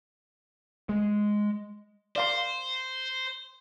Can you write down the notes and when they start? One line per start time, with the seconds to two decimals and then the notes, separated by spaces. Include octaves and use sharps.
0.89 G#3
2.16 C5 D5 F5 C6